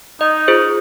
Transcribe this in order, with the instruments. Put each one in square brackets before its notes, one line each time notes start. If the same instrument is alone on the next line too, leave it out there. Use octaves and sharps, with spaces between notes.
[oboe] D#4 [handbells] D#5
[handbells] F4 G#4 C5